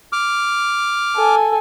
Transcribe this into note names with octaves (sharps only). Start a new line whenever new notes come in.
D6 F6
A4 G#5